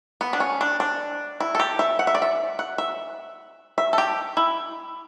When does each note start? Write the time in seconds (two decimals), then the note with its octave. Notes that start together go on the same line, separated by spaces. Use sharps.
0.21 B3
0.33 D4
0.40 C#4
0.61 D4
0.80 D4
1.40 E4
1.55 A4
1.60 G4
1.79 E5
1.99 F#5
2.07 E5
2.15 D5
2.22 E5
2.59 F#5
2.78 E5
3.78 E5
3.93 A4
3.98 G4
4.37 E4